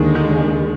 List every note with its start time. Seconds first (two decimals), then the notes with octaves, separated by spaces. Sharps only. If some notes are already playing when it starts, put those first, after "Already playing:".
Already playing: D#2 D3 D#3 G#3
0.15 D#3